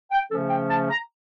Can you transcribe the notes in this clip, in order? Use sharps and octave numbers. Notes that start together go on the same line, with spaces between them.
G5
C#3 F3 A3 C#4 A4
G5
A5
A#5